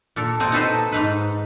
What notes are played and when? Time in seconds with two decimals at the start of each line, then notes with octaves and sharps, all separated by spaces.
0.16 A#2 A4 A#4
0.40 A#2 C4 D#5 G5
0.52 D#4 F#4 A4 B4 C5 D#5
0.92 G#2 D#4 B4